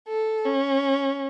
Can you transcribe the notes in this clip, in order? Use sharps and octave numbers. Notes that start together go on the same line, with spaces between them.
A4
C#4